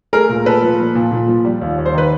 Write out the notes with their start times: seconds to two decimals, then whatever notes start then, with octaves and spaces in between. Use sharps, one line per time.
0.13 A3 G#4 A#4
0.29 A#2
0.46 A#2 A4 B4
0.62 F3
0.79 A#3
0.95 A#2
1.12 A#2
1.28 F3
1.45 G3
1.61 D#2
1.78 D#2
1.86 C5
1.94 D#3 B4